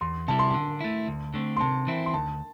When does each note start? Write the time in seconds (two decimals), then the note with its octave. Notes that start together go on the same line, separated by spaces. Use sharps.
0.01 E2 C6
0.28 C3 G3 E4 A5
0.39 C6
0.50 D3 A5
0.81 A3 E4
1.08 D2
1.34 D3 A3 C4
1.57 C6
1.60 C3 A5
1.87 E3 C4 E4
2.06 C6
2.14 D2 A5